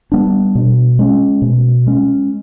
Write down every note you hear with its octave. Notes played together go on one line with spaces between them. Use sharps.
G3 B3 D4
B2
G#3 C#4
B2
G#3 C#4